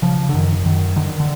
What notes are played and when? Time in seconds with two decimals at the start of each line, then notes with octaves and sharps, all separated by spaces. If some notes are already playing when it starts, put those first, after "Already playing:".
0.02 C#3 F3
0.29 D3
0.34 F#2 D#3
0.65 F#2 D#3
0.96 D3 D#3
1.20 D3